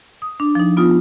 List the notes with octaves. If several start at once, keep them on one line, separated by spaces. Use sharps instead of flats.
D#6
D4
F3 D#4
B3 F4 D#6